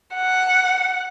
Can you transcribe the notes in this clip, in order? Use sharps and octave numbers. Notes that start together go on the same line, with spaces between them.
F#5